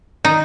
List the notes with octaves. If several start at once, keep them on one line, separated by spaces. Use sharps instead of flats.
D#3 D#4